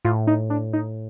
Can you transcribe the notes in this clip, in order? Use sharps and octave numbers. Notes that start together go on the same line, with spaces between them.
A2 F4
D#4
D4
D#4